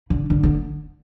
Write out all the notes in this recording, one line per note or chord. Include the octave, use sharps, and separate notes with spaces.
D3
D3
D3